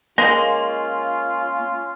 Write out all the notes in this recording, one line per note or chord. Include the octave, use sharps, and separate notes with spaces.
G#3 A#3 C#4 F4 A#6